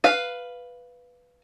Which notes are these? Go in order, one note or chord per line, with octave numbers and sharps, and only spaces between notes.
B4 F5